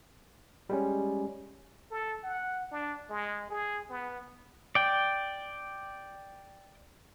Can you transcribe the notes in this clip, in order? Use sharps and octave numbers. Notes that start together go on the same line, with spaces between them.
G3 G#3 C#4
A4
F#5
D4
G#3
G#4
B3
D5 G5